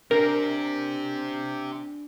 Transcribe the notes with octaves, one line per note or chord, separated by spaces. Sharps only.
C4 D4 G4 A#4